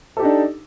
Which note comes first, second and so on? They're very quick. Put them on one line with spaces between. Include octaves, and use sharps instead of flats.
A4 G4 D#4 D4